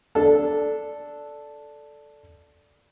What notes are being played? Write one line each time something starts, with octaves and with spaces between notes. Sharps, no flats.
D4 A4